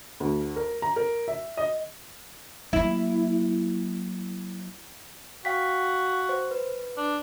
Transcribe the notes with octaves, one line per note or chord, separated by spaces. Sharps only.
D2
A#4
A#5
A#4
E5
D#5
F#3 A#3 E4
F#4 F5 G5 B6
C5
B4
D4